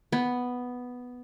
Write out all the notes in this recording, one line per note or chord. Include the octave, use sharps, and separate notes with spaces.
B3